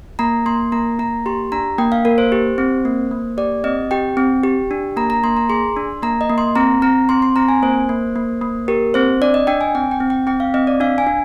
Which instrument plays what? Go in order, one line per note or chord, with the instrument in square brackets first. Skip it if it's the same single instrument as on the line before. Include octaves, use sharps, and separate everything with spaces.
[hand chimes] A#3 A#5
A#3 C6
A#3 A#5
A#3 A#5
G4 C6
D4 A#5
A#3 G5
F5
A#3 A#4
C5
G4
C4
A#3
A#3
G4 D5
C4 D#5
G4 G5
C4
G4
D4
A#3 A#5
A#5
A#3 C6
A#5
G#4 C6
D4
A#3 A#5
D#5
A#3
C6
C4 A#5
C4 A#5
C4 C6
C6
C4 A#5
G#5
A#3 C5
A#3
A#3
A#3
G4 A#4
C4 C5
D4 D5
D#5
D4 G5
G#5
C4 G5
G5
C4
G5
C4 G5
F5
C4 D#5
D5
D4 F5
G#5
D4